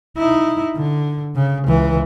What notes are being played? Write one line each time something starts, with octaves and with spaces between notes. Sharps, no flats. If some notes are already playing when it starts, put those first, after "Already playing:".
D#4 E4
D3
C#3
C#2 E3